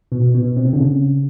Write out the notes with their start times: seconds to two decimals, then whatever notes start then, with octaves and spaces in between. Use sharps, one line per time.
0.12 B2
0.34 B2
0.57 C3
0.73 D3
0.79 C#3